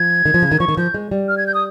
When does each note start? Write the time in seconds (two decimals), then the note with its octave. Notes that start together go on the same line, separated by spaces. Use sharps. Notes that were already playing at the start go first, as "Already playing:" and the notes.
Already playing: F3 G#6
0.26 D#3
0.34 F3
0.42 C#3
0.52 D#3
0.60 F3 C#6
0.68 D#3
0.77 F3 G6
0.94 G#3
1.11 G3
1.28 F6
1.38 G#6
1.47 G6
1.54 D#6